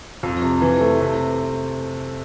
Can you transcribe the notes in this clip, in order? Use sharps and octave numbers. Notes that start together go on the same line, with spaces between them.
F2
C3
E3
A3
C3